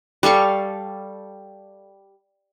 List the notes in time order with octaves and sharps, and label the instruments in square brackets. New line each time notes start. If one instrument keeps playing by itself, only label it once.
[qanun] G3 A4 F5 C#6